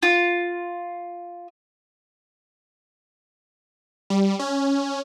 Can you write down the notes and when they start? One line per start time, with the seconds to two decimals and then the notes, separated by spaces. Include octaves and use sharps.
0.03 F4
4.10 G3
4.39 C#4